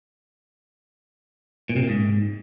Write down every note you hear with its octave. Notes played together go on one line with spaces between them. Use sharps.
A#2
C3
A#2
G#2